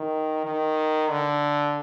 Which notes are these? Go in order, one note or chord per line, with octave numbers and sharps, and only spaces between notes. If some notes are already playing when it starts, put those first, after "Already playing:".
Already playing: D#3
D#3
D3